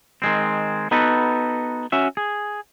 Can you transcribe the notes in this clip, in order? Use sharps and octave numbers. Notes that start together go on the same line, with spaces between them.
D#3 G#3 C4
B3 D#4 F#4 A4 B4
C#4 F#4 E5
G#4